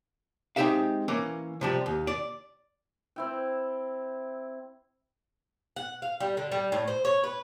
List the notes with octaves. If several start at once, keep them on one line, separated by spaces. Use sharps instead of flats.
G#3 C4 D#4 G4 E5 F5
E3 A#3 C#4
C3 F3 G3
D#2
D5
C4 E4 G5
F#5
F5
G3
D3
G3
A2
C5
C#5
B4